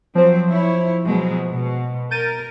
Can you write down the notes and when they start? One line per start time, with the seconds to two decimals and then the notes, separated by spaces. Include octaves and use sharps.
0.15 F3 F#3 C4 C5
0.48 E4 C#5
1.04 B2 F#3 G#3
1.51 B2
2.11 A#4 G6 A6 D#7